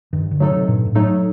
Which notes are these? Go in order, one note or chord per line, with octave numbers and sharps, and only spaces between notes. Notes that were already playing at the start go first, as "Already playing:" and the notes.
G2 D#3
D3
F#3 A3 D#4 A4
C3
G2 A#2
A2
F#3 A3 D#4 A4